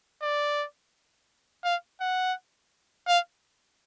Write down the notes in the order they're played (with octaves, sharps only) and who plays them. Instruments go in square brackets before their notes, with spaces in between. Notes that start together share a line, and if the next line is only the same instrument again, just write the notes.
[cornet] D5
F5
F#5
F5